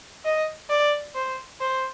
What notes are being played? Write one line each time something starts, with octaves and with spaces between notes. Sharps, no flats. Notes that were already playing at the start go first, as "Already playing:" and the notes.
D#5
D5
C5
C5